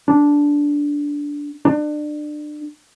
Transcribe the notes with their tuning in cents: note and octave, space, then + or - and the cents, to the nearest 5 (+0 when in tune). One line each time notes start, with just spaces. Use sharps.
D4 -10
D4 +30